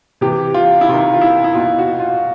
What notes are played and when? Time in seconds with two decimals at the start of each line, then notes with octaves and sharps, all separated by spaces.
0.21 C3 E3 G4
0.54 F4
0.81 E4
0.88 C3 D#3 F4
1.14 F4
1.21 E4
1.44 E4
1.55 B2 F4
1.79 F#4
2.00 F4